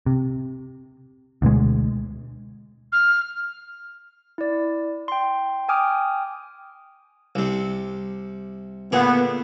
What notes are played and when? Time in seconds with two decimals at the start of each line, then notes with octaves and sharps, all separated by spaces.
0.06 C3
1.42 D2 B2 G#3
2.92 F6
4.38 E4 D5
5.08 G5 C6
5.68 G5 G#5 D6 D#6 F6
7.35 C2 C3
8.92 A#2 D3 B3 G#4